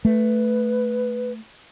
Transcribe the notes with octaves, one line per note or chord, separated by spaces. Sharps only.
A3 B4